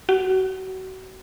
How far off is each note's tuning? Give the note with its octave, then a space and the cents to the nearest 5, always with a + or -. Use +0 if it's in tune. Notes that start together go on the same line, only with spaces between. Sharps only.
F#4 +30